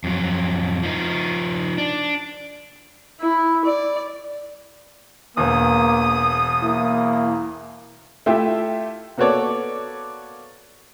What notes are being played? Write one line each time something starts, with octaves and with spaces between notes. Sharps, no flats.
F2 F#3
F3 D#4
D4
E4
D5
E1 E2 A#3 D#6
A#3 E4
A3 E4 F4 G4 E5
A#3 B3 F#4 A4 C#5 D5